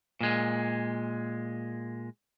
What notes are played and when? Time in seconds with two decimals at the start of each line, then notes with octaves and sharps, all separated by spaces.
0.21 A#2 G#3